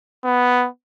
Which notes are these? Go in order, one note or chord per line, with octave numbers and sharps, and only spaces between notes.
B3